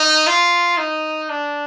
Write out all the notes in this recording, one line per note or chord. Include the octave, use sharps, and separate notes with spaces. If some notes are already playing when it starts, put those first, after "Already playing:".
Already playing: D#4
F4
D#4
D4